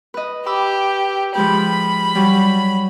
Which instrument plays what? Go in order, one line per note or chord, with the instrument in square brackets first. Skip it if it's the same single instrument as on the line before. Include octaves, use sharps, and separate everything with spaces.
[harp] B4 D#5
[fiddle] G4 [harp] B5 D6 E6
[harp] F3 G#3 G4 [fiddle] B5
[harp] F#3 G3